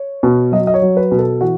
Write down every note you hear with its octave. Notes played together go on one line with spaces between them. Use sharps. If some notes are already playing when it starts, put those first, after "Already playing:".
Already playing: C#5
B2
F#3 D#5
D#5
C#5
F#3
B4
B2
A4
E3 F#4